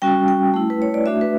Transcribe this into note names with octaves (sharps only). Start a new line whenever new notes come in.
G3 C#4 F#4 G5
G5
A3 E4
B4
C#5
D5
A3 D4 F#4 E5
B4